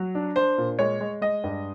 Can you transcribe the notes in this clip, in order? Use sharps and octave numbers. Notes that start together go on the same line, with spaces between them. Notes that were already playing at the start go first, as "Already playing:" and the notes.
Already playing: F#3
D4
D4 C5
A#2
G#3 C#5
G#3
G#3 D#5
G2